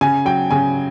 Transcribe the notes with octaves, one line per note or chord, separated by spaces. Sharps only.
C#3 G#5
F#3 G5
C#3 G#5